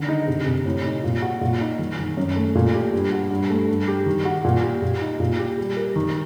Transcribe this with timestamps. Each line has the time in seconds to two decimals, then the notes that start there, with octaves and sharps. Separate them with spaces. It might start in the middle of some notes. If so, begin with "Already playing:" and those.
Already playing: D3 D#3
0.08 D#4
0.27 C3
0.46 C3
0.66 A2
0.85 D#4
1.04 A#2
1.22 F#4
1.41 A#2
1.60 D#4
1.79 D#3
1.99 D#3
2.17 F#2
2.36 A3
2.55 A#2
2.74 G4
2.93 G2
3.12 F#4
3.31 G2
3.50 A3
3.69 G2
3.88 G4
4.06 D#3
4.25 F#4
4.44 A#2
4.63 G4
4.82 A#2
5.01 D#4
5.20 A#2
5.39 G4
5.58 G3
5.77 A#4
5.96 D#3